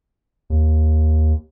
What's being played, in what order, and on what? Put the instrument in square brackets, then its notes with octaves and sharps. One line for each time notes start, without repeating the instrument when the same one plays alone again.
[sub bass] D#2